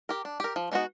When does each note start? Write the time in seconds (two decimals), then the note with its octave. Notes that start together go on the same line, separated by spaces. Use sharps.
0.09 G4 A#4
0.25 D4
0.40 G4 A#4
0.56 F3
0.72 G#3 B3 D#4 F#4